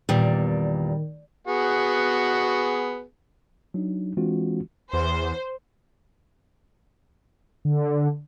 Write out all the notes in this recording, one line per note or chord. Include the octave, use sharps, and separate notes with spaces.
E2 A#2 D#3 G3
B3 F#4 G#4
F#3 D4 D#4
E3 G#3 C4 D4 F4 F#4
E2 C5
D3